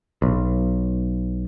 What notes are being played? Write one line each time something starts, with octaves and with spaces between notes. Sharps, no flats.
B1